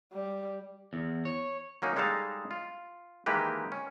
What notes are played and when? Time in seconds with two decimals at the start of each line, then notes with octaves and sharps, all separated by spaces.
0.13 G3
0.93 E2
1.25 C#5
1.82 F#3 A#3 C#4 D#4
1.96 G3 G#3 D#4 A4 F5 A5
2.51 F4
3.26 D#3 E3 G#3 A#3 G4 B4
3.72 C#4